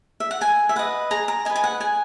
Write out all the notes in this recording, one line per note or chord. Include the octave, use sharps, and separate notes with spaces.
E5
F#5
G#4 G#5
E5
B4 D#5 F#5
G#4 A#5
A#5
B4 D#5 G#5
G#5
F#5
G#4 G#5